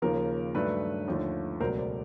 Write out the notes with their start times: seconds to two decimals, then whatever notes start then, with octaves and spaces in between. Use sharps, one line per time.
0.02 D#2 C#3 F3 A#3 A#4
0.55 G2 D#3 F#3 A3 D4 B4
1.08 D#2 D3 F3 A3
1.60 C#2 B2 F#3 A3 D4 A#4 C5
1.78 C5 D5